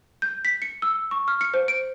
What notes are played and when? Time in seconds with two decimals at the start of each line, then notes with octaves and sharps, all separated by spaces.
0.22 G6
0.45 B6
0.62 C#7
0.82 E6
1.11 C#6
1.28 F6
1.41 C#7
1.54 C5
1.68 D7